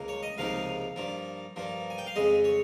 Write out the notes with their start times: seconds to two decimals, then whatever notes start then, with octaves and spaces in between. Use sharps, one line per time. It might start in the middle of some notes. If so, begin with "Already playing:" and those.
Already playing: C#2 A#3
0.08 C#5
0.23 D#5
0.37 C#2 C3 F3 A#3 D#4 F5
0.96 G2 F3 A#3
1.56 G2 F3 A#3
1.90 G#5
1.98 G5
2.07 F5
2.16 F2 C#3 G#3 D#5
2.44 C#5